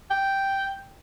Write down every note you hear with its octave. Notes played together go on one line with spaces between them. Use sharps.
G5